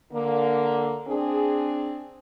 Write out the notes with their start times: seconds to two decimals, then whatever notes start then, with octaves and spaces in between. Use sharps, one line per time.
0.13 D3 A#3
1.08 C4 D4 G#4